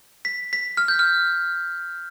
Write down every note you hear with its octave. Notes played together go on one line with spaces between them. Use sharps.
B6
B6
F6
G6
F6